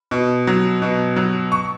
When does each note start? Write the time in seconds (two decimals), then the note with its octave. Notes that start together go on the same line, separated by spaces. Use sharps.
0.11 B2
0.47 F#3
0.82 B2
1.16 F#3
1.52 C#6